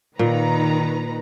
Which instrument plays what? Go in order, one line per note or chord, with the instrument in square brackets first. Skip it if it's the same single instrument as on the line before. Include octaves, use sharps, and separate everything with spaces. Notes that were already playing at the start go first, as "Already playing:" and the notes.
[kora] A#2 [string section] D#3 B4 A#5